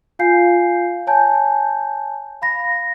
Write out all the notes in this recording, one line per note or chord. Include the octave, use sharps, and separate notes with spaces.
F4 F5 G#5 G6 C7
C#5 G#5 A5 G6
F5 B5 A#6